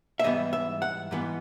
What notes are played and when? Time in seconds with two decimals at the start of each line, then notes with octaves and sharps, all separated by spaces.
0.19 E5
0.24 G#2 E3 G3 B3 D#5
0.53 E5
0.82 F#5
1.11 G#2 E3 G3 B3